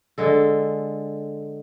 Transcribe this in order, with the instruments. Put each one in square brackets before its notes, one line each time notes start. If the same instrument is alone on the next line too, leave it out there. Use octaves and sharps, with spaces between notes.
[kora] D3 G#3 A4